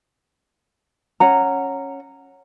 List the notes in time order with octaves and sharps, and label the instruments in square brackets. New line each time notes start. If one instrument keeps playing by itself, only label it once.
[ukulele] C#4 F#5 A#5